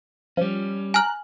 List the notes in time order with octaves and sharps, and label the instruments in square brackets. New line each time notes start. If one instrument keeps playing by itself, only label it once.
[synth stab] F3 [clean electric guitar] G3 C#4
[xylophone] G#5 F6 [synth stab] A#5 F#6